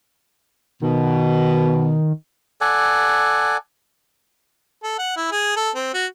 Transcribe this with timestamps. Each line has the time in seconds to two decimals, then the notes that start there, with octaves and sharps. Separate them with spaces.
0.82 B2 D#3
2.61 A4 D5 F#5 G#5
4.84 A4
4.99 F#5
5.17 E4
5.32 G#4
5.57 A4
5.76 C4
5.94 F#4